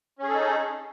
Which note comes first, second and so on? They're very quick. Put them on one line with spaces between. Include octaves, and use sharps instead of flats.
C#4 G#4 A4 D#4